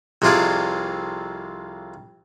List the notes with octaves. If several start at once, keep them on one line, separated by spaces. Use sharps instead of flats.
C2 F2 C3 F4 G#4 D5